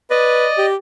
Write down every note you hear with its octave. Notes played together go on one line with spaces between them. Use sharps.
B4 D5 D#5
G4